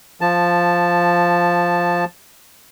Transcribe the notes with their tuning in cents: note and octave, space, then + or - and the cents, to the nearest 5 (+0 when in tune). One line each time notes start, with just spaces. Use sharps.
F3 +0 A5 +0